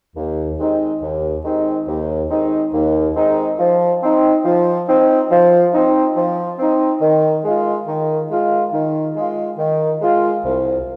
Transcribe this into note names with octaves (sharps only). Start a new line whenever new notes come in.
D#2
D#3 G#3 C4 D#4
D#2
D#3 G#3 C4 D#4
D#2
D#3 G#3 C4 D#4
D#2
D#3 G#3 C4 D#4
F3
C4 D#4
F3
C4 D#4
F3
C4 D#4
F3
C4 D#4
D#3
G#3 F4
D#3
G#3 F4
D#3
G#3 F4
D#3
G#3 F4
C2